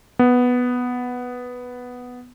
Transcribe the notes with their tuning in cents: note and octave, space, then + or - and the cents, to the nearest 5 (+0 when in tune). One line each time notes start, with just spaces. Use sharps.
B3 +0